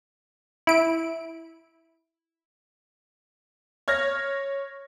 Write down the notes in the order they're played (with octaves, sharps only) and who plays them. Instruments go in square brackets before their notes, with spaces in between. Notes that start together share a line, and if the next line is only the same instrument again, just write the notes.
[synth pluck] E4 D7
[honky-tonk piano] C#5 F6 G#6 A#6